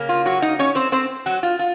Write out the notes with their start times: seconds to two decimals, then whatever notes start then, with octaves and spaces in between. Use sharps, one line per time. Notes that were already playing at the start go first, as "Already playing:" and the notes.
Already playing: C#3 A#3 C#4
0.09 F4
0.26 F#3 F#4
0.42 D#4 D#5
0.59 C#4 C#5
0.75 C4 C5
0.92 C4 C5
1.26 F#3 F#4
1.43 F4
1.59 F4